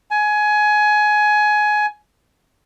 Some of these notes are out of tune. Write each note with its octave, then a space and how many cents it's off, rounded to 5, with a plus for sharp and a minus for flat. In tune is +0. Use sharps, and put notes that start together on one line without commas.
G#5 +20